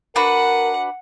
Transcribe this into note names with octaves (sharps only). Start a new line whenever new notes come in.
D4 F#4 A#4 B4 F#5